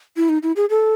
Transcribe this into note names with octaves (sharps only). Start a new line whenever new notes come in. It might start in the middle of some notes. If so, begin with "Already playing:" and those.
E4
D#4
E4
G#4
A4